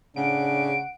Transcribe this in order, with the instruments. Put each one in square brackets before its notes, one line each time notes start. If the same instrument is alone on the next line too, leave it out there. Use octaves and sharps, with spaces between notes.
[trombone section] A2 D4 [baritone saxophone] C#3 [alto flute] F#5 [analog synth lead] D7